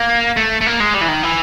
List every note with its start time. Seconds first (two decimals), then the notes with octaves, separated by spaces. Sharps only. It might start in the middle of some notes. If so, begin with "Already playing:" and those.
Already playing: A#3
0.37 A3
0.61 A3
0.66 A#3
0.80 G#3
0.94 G3
1.01 E3
1.09 D#3
1.23 E3